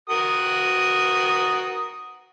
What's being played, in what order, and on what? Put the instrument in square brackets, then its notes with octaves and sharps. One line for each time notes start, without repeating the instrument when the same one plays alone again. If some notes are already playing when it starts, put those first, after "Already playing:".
[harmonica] F#4 A#4 D#6